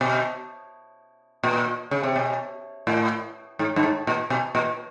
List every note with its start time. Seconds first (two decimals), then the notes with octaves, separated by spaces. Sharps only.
0.01 B2
1.43 A#2
1.91 C#3
2.03 C3
2.16 B2
2.87 A2
3.59 G#2
3.76 G2
3.83 G#2
4.07 A#2
4.30 B2
4.55 A#2